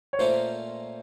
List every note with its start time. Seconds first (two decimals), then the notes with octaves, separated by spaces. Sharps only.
0.13 C#5
0.19 A#2 A3 C#4 F4 A#4 C5